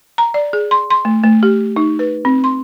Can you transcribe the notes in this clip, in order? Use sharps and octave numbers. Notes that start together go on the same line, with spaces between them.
A#5
D5
G#4
C6
C6
A3
A3
G4
D#4
B4
C4
C6